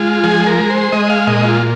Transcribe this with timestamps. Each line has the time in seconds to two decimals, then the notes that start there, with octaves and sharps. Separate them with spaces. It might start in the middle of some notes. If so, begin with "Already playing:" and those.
Already playing: G#3 F4
0.24 F3 G#4
0.47 A#4
0.58 G#3
0.70 C5
0.92 G#3 D#5
1.10 F5
1.27 A#2 D#5
1.44 F4